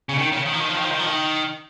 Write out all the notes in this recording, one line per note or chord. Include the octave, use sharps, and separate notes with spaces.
C#3
D#3
C#3
D#3
F3
D#3
F3
D#3
F3
D#3
F3
D#3